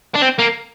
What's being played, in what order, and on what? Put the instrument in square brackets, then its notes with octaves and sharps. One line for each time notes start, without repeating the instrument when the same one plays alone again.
[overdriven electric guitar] D4
C4
A#3